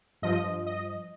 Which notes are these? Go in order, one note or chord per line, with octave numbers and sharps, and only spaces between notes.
G2 F3 D#5
D#5